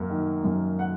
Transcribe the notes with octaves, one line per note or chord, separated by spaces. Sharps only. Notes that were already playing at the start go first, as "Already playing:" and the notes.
Already playing: F#2 A#3
D#3
F#2
F#5